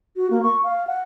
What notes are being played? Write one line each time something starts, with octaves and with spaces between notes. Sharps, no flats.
F#4
A#3
C#6
F5
F#5